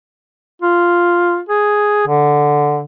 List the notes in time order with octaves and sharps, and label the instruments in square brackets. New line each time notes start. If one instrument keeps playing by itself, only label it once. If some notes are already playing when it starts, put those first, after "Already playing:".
[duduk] F4
G#4
D3